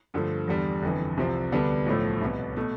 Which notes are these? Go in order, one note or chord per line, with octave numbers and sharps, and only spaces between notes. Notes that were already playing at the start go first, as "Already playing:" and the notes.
G2 D3 F3 A3
E2 D3 G3
G1 F2 E3
C2 C3 F3 C4
D2 D3 G3 B3 D4
B1 A2 F3 A3
C2 B2 B3
B2 A3